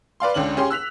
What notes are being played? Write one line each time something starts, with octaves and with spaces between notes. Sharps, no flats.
B4 D5 F5 C6
C#2 D3 C#4 F#7
C#4 G4 G#4 C6
E6 F#6 B6 F7